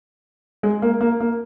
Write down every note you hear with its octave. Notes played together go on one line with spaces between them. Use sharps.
G#3
A#3
A#3
A#3